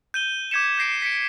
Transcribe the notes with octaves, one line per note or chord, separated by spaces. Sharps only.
G6 D#7 G7
D6 G6 G#6 B6 C#7 E7
G6 A#6 C7 D7
B6 C#7 D7